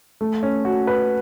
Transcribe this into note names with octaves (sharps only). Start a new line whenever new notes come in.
A3
C#4
F#4
B4